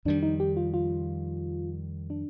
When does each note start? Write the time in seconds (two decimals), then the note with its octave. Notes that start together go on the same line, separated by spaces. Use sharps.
0.05 F2 D#3 G3 D4
0.23 D#4
0.40 G4
0.57 F4
0.74 F4
2.10 D4